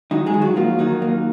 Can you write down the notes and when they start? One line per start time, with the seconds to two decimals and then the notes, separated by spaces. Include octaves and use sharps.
0.11 D#3 F#3 D#4
0.26 G#3 G#4
0.34 D#3
0.41 F#3 F#4
0.56 F3 A#3 F4
0.79 D#3 F#3 D#4
1.02 A#3